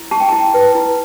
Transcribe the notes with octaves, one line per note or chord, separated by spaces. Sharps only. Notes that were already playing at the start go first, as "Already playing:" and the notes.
Already playing: E4
G4 A5
G5
E4 A5
B4
E4